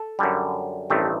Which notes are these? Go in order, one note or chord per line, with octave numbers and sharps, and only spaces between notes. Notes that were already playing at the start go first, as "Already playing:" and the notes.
Already playing: A4
F#2 D3 G3
A1 G2 D#3 A3 C4